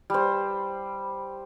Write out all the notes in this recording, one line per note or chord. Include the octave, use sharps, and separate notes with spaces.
G3 C5